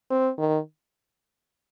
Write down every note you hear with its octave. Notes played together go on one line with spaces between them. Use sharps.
C4
D#3